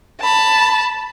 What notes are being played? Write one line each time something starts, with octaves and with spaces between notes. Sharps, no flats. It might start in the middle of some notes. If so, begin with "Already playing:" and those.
A5 B5